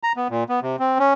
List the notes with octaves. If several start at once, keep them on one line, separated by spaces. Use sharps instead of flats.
A#5
B3
A#2
B3
C3
C4
C#4